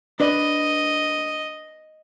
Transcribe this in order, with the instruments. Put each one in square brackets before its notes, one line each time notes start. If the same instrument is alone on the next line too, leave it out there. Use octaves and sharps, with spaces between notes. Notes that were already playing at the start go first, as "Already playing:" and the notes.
[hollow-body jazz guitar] D4 B4 D5 [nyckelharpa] D#5